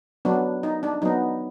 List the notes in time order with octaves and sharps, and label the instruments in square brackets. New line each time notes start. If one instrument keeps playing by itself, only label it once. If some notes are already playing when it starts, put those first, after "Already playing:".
[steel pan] F#3 B3 D4
D#4
D4
F#3 B3 D#4